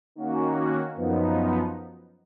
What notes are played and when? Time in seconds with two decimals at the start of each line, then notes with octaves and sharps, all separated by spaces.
0.15 D#3 A#3 C#4 F#4
0.96 F#2 F3 B3 D#4